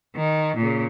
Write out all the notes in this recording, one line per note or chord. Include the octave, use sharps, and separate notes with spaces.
D#3
A#2 C#3